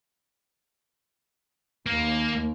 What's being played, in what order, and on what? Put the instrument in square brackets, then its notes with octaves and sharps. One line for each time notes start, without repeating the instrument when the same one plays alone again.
[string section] D#2 [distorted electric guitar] A#3